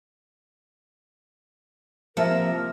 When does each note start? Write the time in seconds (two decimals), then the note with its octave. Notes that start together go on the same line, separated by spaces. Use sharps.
2.17 C3 F3 A#3 A#4 E5